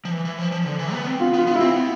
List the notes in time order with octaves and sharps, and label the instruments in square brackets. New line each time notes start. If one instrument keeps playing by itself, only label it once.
[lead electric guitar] F3
E3
E3
F3
F3
D3
E3
B3
C4
[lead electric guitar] B3 [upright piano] F4
[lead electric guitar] B3 [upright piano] F4
[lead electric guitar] B3 [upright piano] F4
[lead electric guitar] C4 [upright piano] E4
[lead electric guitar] B3